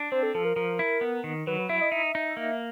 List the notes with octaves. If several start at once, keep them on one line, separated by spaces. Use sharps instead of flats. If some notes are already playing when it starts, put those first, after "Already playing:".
Already playing: D4
C4 C5
A4
F3 A4
A#4
F3 A#4
E4
B3
D#3
F#3 B4
B4
E4 E5
D#5
D#4 E5
D#4
A#3